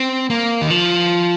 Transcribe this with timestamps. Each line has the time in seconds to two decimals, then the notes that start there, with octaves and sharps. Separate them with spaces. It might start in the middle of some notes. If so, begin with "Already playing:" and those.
Already playing: C4
0.30 A#3
0.61 D#3
0.70 F3